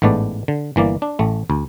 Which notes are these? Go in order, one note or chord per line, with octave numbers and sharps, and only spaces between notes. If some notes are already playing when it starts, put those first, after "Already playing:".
A1 G#2 A3 B3 D5
D3
G1 E3 A#3 D5
D4
A1 A3
D2